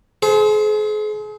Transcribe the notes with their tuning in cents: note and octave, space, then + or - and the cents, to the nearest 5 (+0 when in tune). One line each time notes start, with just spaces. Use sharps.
G#4 +40 C5 -15